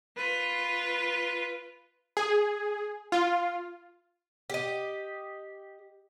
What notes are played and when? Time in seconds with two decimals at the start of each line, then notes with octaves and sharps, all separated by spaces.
0.17 F4 B4
2.17 G#4
3.12 F4
4.50 G4 D#5